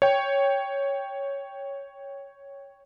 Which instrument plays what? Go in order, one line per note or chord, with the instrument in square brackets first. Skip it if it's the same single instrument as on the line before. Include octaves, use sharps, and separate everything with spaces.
[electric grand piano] C#5 G5